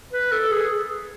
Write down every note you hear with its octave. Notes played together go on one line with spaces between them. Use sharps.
B4
A4
G#4